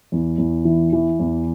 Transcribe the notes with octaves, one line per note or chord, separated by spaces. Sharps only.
E2
E2
E3
E3
E2